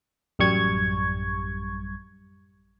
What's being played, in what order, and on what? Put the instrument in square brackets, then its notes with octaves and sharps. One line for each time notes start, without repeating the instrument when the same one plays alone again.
[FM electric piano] A1 F#2 G3 C#6 G#6